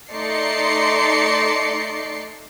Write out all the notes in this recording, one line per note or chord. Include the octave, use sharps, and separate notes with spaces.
A3 D#4 D5 C6 C7 C#7